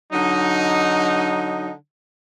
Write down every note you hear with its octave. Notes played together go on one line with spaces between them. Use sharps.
D3 F#3 D#4